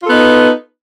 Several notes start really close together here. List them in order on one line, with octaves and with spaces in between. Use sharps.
F4 A4 B3 D#4 B4